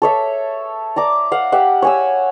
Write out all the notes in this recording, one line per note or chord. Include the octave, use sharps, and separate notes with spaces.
A4 C#5 E5
D5 A#5 D6
F5 F#5
G4 E5 F#5
C#5 G#5 E6